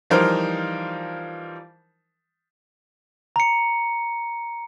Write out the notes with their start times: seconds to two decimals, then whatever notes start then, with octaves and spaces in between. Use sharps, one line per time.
0.10 E3 F3 G3 D#4 A#4 C5
3.36 A#5 C#7